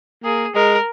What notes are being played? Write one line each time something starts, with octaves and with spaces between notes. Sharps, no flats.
A#3 G#4
G#3 A#4